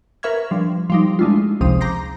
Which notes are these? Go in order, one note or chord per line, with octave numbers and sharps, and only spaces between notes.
A#4 B4 E5 C#6 F6 G#6
F3 G3 D4
F3 G3 D#4
G#3 A3 D4 E4 F4
G#1 C#2 C3 F3 D#6
A#5 D6 G6 A#6 C7